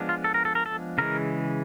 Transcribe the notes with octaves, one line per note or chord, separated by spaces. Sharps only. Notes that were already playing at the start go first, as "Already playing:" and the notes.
Already playing: F3 G#3 B3 D4
F4
A4
A#4
A4
A#4
A4
C#3 E3 G#3 A#4